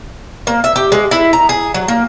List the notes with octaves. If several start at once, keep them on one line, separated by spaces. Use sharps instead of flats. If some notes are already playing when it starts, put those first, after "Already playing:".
A#3
E5
G4
G#3
E4
A#5
G#4
F#3
A#3